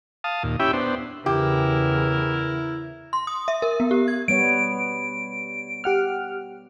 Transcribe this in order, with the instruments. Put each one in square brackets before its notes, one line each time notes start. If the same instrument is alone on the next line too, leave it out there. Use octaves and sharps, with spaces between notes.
[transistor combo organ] F5 A5 D#6
D#2 A#2
C#4 E4 G4 E5 G5 B5
B3 D4 C5
[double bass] E2 C#3 [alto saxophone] E4 [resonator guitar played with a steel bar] G4 [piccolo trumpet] A#4
[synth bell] C6
D#6
E5
A#4
B3
G4
G#6
[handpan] G3 B3 C#5 [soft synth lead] D7
[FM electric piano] G4 F#5 F6